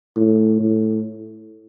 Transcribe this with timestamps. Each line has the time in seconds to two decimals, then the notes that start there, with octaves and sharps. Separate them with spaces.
0.16 A2
0.60 A2